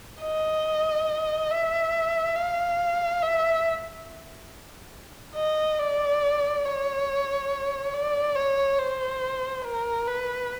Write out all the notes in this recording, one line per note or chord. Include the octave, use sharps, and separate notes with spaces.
D#5
E5
F5
E5
D#5
D5
C#5
D5
C#5
C5
A#4
B4